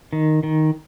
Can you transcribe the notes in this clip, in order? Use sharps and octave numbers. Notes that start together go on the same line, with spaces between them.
D#3
D#3